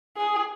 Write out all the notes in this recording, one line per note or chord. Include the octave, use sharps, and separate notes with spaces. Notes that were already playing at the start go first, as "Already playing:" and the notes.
G#4